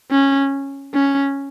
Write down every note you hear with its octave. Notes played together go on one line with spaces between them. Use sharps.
C#4
C#4